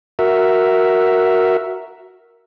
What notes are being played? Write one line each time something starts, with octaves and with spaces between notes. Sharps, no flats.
F#4 A#4 E5